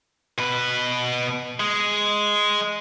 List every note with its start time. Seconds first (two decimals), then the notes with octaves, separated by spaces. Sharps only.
0.38 B2 B4
1.60 G#3